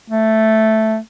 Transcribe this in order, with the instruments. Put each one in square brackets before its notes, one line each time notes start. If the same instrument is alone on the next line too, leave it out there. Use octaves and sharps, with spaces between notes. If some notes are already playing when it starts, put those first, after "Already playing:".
[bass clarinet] A3